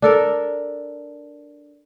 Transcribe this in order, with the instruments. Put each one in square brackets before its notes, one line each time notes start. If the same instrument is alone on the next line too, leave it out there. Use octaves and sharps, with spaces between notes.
[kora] D4 A4 A#4